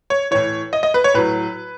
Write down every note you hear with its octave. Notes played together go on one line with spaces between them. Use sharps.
C#5
A2 E3 C#5
D#5
D#5
B4
C#5
A2 F#3 B4